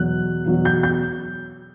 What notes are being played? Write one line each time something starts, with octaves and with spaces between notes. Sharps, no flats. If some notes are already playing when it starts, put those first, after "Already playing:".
Already playing: E2 B2 F#3 F#6
E2 B2 F#3
G6
G6